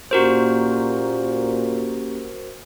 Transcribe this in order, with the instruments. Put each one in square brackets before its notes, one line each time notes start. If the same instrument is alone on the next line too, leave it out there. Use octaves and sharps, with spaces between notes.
[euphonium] A#2 [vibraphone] A#3 C#4 G4 [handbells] F#4 A#4 C5